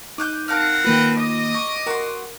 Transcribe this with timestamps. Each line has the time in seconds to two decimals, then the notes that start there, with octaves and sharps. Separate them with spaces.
0.18 D#4 D6 F#6 G6
0.48 C4 D4 A#4 F5 F#5 F6
0.84 D#3 A#3 F4 B4 G5
1.17 D#5 D6 D#6
1.54 C#6
1.87 F#4 A#4 C6